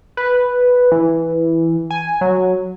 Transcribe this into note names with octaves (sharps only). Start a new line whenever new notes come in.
B4
E3
G#5
F#3